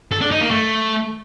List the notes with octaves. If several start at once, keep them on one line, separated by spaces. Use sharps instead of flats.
A4
D4
D#4
A#3
A3